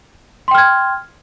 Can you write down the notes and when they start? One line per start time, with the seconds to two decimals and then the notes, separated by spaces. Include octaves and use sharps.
0.48 C6
0.51 G5
0.55 F6
0.58 G#6